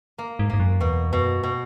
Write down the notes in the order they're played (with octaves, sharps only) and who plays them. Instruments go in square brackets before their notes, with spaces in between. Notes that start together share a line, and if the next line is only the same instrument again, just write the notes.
[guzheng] A#3
[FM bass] G#2
[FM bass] G#2 [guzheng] A#3
[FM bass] F#2
[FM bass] E2 [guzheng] B2
[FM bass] F#2 [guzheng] B2
[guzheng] B2